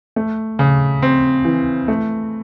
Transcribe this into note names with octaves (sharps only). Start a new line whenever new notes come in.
A3
C#3
C4
E3
A3